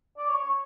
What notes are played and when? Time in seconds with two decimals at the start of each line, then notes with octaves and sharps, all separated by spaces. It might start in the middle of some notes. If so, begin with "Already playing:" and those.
0.18 D5
0.29 C#5
0.44 C#5